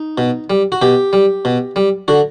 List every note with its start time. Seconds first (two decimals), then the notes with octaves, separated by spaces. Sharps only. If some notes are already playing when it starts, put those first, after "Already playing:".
Already playing: D#4
0.18 B2
0.50 G3
0.72 F#4
0.82 B2 G4
1.13 G3
1.45 B2
1.76 G3
2.08 D3 F#4